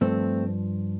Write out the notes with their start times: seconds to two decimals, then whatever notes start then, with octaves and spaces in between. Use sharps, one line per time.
0.01 G2 F3 A3 C4